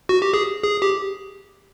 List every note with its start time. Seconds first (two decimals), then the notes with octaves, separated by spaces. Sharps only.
0.09 F#4
0.22 G4
0.34 G#4
0.63 G#4
0.82 G4